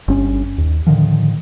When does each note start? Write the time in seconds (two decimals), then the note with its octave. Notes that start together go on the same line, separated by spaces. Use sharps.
0.08 G1 C#4
0.58 D#2
0.87 A2 D3 D#3 F3